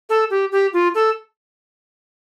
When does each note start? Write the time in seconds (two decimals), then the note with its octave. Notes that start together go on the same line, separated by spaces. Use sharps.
0.10 A4
0.30 G4
0.52 G4
0.73 F4
0.95 A4